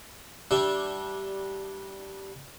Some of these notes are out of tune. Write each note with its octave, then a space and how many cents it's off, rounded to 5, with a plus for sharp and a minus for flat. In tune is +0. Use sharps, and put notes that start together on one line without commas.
G3 -10 D4 +0 E5 +0